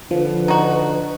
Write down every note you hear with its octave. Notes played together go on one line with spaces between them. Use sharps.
D3 F3 B4
D#4 F#4